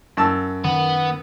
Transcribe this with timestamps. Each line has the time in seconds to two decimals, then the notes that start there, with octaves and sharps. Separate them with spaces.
0.17 F#2 A5 E6
0.64 D#3 B3